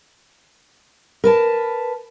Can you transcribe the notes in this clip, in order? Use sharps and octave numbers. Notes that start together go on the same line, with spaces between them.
A#4 B4 A5